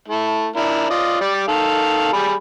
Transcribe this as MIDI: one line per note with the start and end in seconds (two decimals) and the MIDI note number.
0.08 0.48 57
0.08 0.48 64
0.56 0.89 62
0.56 0.89 64
0.56 0.89 70
0.90 1.17 65
0.90 1.17 74
0.90 1.17 75
1.21 1.47 55
1.21 1.47 74
1.48 2.09 51
1.48 2.09 69
1.48 2.09 77
2.13 2.34 55
2.13 2.34 68
2.13 2.34 83